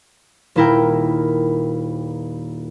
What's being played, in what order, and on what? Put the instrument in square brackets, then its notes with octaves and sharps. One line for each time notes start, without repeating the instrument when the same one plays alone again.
[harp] D#1 A#2 E4 A#4 G5